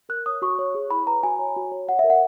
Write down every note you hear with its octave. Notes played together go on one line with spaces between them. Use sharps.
A#4 F#6
C#5 D#6
F#4 C#6
C#5
G#4
E4 B5
B4 A#5
F#4 G#5
C#5
F#4
C#5
C#5 F#5
E5
A#4
F#5